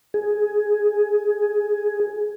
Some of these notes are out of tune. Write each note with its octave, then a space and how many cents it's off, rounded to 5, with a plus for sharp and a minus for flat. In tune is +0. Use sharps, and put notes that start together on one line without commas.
G#4 +10